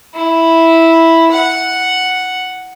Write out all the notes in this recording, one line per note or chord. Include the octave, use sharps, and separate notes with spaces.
E4
F#5